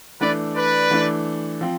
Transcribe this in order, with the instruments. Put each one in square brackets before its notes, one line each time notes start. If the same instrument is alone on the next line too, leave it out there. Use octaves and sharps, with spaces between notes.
[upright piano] E3 A3 D4 [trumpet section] B4 D5
[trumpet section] B4 D5
[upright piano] E3 A3 D4
F3 C4